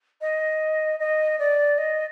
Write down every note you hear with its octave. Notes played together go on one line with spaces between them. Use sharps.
D#5
D#5
D5
D#5